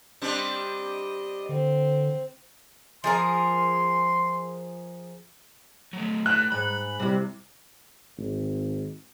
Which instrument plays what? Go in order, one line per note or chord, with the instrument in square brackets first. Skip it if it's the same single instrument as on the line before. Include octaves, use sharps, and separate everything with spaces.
[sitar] G3 C4 D4 [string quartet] D#5
[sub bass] D3 [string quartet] C4
[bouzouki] F3 G#4 A#4 [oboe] C6
[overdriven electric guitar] F#3 A3
[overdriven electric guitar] A2 [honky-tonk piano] F#6
[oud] G#2 [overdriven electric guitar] B5
[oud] C3 E4 [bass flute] G3
[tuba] G#1